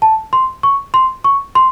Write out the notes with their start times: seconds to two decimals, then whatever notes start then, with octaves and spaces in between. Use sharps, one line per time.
0.02 A5
0.33 C6
0.63 C#6
0.94 C6
1.24 C#6
1.55 C6